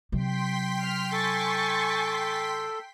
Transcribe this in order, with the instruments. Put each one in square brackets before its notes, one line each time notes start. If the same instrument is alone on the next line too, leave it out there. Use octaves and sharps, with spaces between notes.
[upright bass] C3 F#3 [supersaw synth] G5 C6 B6
[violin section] F6
[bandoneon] A4 [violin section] G#5 C#6 A6